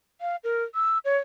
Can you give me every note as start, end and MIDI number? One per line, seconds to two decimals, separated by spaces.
0.21 0.36 77
0.44 0.64 70
0.75 0.98 88
1.05 1.18 73